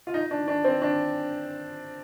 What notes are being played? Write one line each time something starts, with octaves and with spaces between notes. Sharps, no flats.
F4
D#4
D4
D4
C4
D4